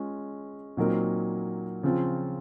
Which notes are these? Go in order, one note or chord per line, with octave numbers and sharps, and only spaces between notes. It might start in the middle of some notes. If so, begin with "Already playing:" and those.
Already playing: G#3 C#4 F4
A#2 F#3 C4 D#4 A#4
C#3 F3 C4 F4